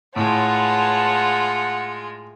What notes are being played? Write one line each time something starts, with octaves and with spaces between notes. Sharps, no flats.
A2 G#3 F4 B4 C#5 F#5 A5